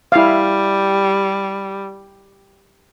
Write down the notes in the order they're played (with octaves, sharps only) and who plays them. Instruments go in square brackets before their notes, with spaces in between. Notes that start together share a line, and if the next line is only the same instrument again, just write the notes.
[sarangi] G3 [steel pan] E4 F5